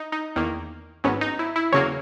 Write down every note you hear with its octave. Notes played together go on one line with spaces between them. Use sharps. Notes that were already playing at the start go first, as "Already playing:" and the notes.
Already playing: D#4
D#4
E2 D#3 A#3
G#1 G#2 F#3 B3 C#4
D#4
E4
E4
E2 C#3 F#3 A#3 C#5